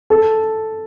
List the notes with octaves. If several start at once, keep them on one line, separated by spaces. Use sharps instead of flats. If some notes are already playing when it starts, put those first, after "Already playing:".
A4